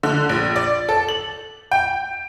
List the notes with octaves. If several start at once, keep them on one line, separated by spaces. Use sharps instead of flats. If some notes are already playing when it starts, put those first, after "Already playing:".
D3
A#1
D5
A4
F#7
G5